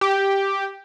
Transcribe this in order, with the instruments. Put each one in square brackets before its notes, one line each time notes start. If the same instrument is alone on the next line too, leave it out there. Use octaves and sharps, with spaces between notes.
[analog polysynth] G4